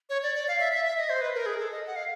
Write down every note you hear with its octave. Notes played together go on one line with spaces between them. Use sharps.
C#5
D5
D5
F5
E5
E5
E5
D#5
C5
B4
A#4
G#4
A4
D#5
F#5
F5